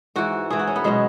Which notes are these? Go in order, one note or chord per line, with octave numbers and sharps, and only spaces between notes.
G#2 E3 F#4
G#2 E3 G#4
F#4
C#4
B3
B2 F#3 G#3